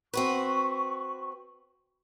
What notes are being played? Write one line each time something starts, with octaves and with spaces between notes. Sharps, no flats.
C4 F#4 B4 C#6